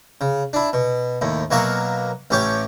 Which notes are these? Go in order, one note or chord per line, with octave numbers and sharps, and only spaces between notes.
C#3
D4 E4
B2
D#2 A2
B2 F#3 A#3 F#4 E5 F5
A1 A2 C#4 G4 C#5 D6